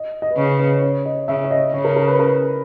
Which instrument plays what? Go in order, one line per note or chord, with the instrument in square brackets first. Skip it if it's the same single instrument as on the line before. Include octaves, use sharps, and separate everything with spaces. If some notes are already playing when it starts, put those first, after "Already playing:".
Already playing: [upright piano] D#5
D#5
B4
[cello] C#3 [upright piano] C#5
[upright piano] B4
C#5
D#5
[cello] C#3 [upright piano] E5
[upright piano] C#5
D#5
[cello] C#3 [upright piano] C#5
[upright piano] A#4
A#4
B4
A#4